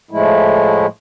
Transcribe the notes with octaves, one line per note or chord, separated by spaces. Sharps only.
A2 F3 G#3 A3 E4